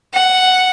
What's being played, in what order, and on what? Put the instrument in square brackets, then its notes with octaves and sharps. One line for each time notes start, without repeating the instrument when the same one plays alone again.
[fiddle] F#5